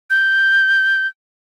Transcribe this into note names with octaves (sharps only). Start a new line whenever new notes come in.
G6